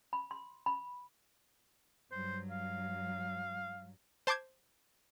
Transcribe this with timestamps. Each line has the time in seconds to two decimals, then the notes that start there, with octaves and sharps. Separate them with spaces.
0.13 B5
0.31 C6
0.66 B5
2.11 G2 F#3 C5
2.51 F5
4.27 C5 A5 C6 D6 G6 G#6